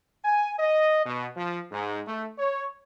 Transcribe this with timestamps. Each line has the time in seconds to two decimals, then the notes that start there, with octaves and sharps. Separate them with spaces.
0.25 G#5
0.58 D#5
1.05 B2
1.37 F3
1.71 G#2
2.07 A3
2.38 C#5